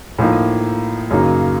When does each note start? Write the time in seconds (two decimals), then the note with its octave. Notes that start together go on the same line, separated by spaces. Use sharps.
0.19 A2 F3 A#3 D#4
1.10 F#2 C#3 F#3 A#3 D#4